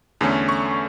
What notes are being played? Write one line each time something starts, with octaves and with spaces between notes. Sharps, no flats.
E2 D3 A3 C#4
C#6